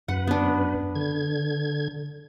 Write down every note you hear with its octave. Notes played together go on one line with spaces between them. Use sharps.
F#2 B4 F#5
B3 D4
D3 G#6